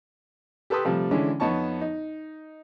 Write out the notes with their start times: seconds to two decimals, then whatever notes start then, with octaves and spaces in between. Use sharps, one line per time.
0.70 G4 A4 B4 G5 C6 D#6
0.84 C3 F3 G3 A3
1.11 D3 E3 G#3 C#4 D4 E4
1.40 F2 B3 D#4 C#5 A5 C#6
1.81 D#4